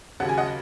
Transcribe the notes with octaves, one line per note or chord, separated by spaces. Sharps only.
D#2 C#3 F#3 F#5
G#5
D#5 F#5